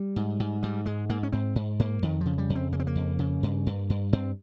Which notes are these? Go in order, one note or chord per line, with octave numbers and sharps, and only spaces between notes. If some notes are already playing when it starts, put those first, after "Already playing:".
Already playing: G3
G#2
G#2
G#2 G3
G#2 G#3
G#2 A#3
C#4
G#2 C4
G#2
G#2 A#3
F2 D#3
C#3 F3
G3
F2
C4
C#3 A#3
C4
A#3
F2
C#3
G2
G2
G2
G2 C4